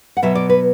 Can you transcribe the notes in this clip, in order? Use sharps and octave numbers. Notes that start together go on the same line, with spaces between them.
F#5
B2 F#3 B3 E5
D5
B4